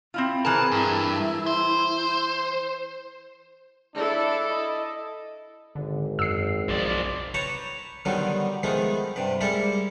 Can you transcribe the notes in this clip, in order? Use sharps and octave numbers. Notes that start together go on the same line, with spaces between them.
C4 E4 F4
E3 C4 G#4 A#4 A5
G2 E4
C5
D4 E4 A4
D#5
G#1 D3
F#2 E6 C7
B1 F3 D5
B4 C#5 G5 A5 A#5 C#6
D3 D#3 F#3 G3 B3 D#4
D#3 F3 G#3 A3 B3 D#4
G2 C3 B4
G3 G#3 A#3 E4 G4 A4